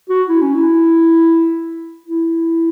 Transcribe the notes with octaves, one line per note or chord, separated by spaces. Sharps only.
F#4
E4
C#4
E4
E4